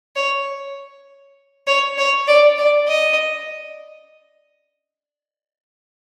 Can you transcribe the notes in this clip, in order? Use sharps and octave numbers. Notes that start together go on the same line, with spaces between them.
C#5
C#5
C#5
D5
D5
D#5